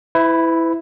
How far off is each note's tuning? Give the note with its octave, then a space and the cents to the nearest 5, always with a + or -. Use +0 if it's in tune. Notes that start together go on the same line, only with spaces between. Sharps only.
E4 +0 B4 +40